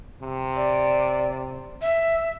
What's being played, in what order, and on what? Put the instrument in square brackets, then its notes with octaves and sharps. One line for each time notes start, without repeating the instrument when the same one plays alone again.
[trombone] C3
[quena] D5
E5